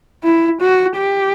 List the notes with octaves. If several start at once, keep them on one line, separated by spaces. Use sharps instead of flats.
E4
F#4
G4